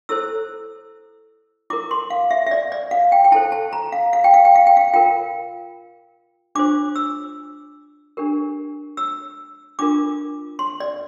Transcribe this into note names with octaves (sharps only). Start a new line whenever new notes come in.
E4 A4 C5 E6
E4 A#4 D6
C6
F5
E5
E5
D5
D5
F5
G5
G5
E4 A4 C5 A5
A5
A#5
F5
F5
G5
F5
G5
F5
G5
F5
F4 A#4 G5
D4 F4 C5 D6
E6
D4 G4 A#4
E6
D4 F4 A#4 D6
C6
D5